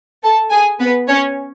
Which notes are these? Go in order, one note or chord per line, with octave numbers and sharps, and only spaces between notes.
A4 A5
G#4 G#5
B3 B4
C#4 C#5